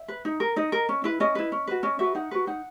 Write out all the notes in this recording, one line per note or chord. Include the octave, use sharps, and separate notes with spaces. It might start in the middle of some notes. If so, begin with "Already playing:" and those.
Already playing: E5
B4
D#4
A#4
D#4 D#5
A#4
C#4
E4 B4
C#4 D#5
E4 B4
C#4
F#4 B4
C#4 D#5
F#4 B4 E5
D#4 F#5
F#4 B4
D#4 F#5